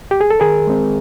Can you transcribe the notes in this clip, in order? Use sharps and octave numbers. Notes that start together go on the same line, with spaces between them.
G4
G#4
A4
D#3 G#4 A#4
G#3 C4